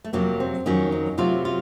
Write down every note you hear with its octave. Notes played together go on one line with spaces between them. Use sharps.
A3
F2 C3 F#3 A#3
C4
F2 D#3 F#3 C#4
D#4
C3 F#3 A3 F4
F4